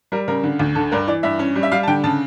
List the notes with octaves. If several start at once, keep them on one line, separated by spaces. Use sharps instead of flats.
G3 A#4
C#3 A#4
D3
D2
D3 A4
G2 A#4
E3 D5
G2 E5
C#4
G3
E5
G3 F5
A5
D3 G5
C#3 A5